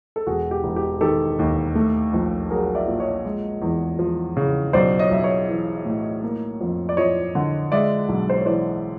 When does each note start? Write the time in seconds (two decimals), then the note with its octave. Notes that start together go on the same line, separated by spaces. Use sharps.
0.16 A4
0.27 E1 F#4 G#4
0.51 G4
0.64 E1
0.76 G4
1.01 D#3 G4 A4
1.39 D#2
1.75 A3
2.13 A#1
2.50 F#3 G#4 A#4
2.75 D5 E5
2.88 A#2
3.00 C#5 D#5
3.25 G#3
3.62 E2
3.99 F3
4.37 C#3
4.73 B1 C5 D5
4.99 C#5 D#5
5.11 B1 E5
5.24 C#5 D#5
5.49 E3
5.85 A2
6.23 A#3
6.61 F2
6.89 D5
6.97 F3 C#5 D#5
7.35 D3
7.72 G#3 D5 E5
8.09 B1
8.29 C5
8.38 C#5
8.46 E3 C5 D5